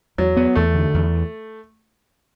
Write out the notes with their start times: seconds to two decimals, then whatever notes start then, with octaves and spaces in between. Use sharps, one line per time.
0.18 E2 F#3
0.37 B3
0.56 E2 A3
0.75 D3
0.94 E2